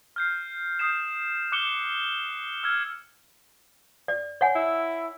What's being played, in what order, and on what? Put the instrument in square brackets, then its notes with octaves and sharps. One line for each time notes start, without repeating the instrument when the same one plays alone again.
[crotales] F6 G6 C7
D#6 G6 C7 E7
D6 F#6 C#7 E7 G7
E6 F6 G#6
[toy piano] D5
C#5 F#5 G#5
[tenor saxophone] E4